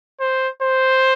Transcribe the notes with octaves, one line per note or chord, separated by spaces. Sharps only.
C5
C5